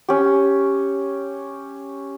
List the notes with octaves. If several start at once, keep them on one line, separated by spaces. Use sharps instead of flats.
C#4 G4